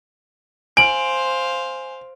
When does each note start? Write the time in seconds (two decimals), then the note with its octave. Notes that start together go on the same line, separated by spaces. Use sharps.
0.77 C5 F5 G#5 D7 F#7